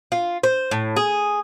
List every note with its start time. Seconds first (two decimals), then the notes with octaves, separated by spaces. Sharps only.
0.12 F4
0.43 C5
0.71 A2
0.96 G#4